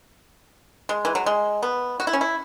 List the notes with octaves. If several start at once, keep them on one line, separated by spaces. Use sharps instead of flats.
G#3
E3
F#3
G#3
B3
F#4
E4
C#4
E4